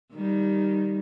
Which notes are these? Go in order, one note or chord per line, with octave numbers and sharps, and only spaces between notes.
D#3 G3